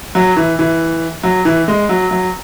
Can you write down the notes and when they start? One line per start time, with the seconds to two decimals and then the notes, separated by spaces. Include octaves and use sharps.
0.15 F#3
0.36 E3
0.59 E3
1.23 F#3
1.45 E3
1.68 G#3
1.89 F#3
2.11 F#3